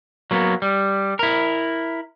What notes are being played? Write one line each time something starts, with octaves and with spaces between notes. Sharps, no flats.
F#3 A#3 B3
G3
E4 A#4